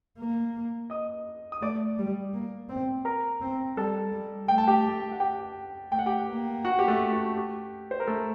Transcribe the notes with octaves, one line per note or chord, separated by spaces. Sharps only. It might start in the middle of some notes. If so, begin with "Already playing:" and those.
A#3
D#5 D#6
D#6
A3 D5 D6
G3
A#3
C4
A#4 A#5
C4
G3 A4 A5
G3
A3 G5
A5
G4 G5
F#5
G4 G5
A3 G5
F#5
G4 G5
A#3
F#4 F#5
G4
A3 A4
F#4
G4
C5
A#4
A3 A4